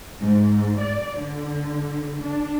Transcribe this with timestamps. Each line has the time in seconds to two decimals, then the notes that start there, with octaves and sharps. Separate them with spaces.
0.21 G#2
0.81 D5
1.19 D3
2.22 D4